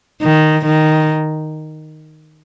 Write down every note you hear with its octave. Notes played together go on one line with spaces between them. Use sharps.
D#3
D#3